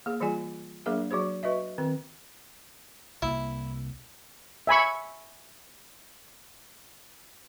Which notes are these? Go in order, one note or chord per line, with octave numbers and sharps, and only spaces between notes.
A#3 G#4
E3 G3 F4 G#4 D5 G#5
F#3 A#3 D4 G#4 A#4 E5
F#3 F#4 G#4 C5
F#4 B4 D#5 E5
D#3 C4 A#4
C2 A#3 E4
E5 G#5 B5 C#6